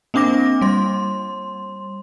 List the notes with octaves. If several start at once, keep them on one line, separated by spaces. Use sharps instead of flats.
A#3 C4 D4 D6 A#6
G3 C6